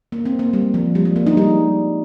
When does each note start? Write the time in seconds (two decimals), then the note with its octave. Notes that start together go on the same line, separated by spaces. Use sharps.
0.12 A#3
0.25 C4
0.39 A#3
0.53 G3
0.74 F3
0.95 G3
1.05 G#3
1.16 A#3
1.27 D#4
1.37 G3